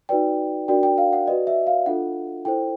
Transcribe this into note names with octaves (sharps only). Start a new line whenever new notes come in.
D#4 F#4 B4 D5 G5
D4 F#4 A#4 D5 G5
G5
F5
F#5
F#4 B4 D5 D#5
E5
F5
D4 F4 A4 F#5
E4 A4 C5 G5